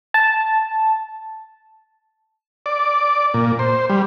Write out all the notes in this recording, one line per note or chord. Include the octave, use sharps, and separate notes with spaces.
A5
D5
A#2
C5
G3